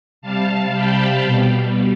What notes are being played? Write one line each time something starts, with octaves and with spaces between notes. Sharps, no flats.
C3 G3 F5 A5
G5 B5
B2 G3